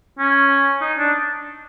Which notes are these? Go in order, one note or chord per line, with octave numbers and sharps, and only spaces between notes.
C#4
D#4
D4